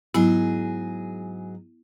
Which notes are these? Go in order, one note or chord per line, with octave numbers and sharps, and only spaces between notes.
G#2 F#3 B3 E4 G#4